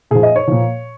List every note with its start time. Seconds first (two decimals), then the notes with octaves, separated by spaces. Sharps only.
0.11 A#2 F3 G#4
0.23 D#5
0.36 C#5
0.48 A#2 F3